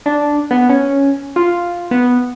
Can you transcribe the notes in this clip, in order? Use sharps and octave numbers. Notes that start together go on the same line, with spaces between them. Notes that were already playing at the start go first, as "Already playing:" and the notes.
D4
B3
C#4
F4
B3